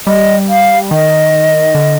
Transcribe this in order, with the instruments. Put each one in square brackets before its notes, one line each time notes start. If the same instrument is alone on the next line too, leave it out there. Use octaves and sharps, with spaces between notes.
[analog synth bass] G3 [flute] D#5
[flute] F5
[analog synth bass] D#3 [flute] D#5
[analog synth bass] D3